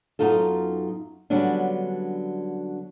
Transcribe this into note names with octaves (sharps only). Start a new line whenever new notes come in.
F#2 A#3 B3 D#4 F4 A4
D3 F#3 G3 B3 C#4 D4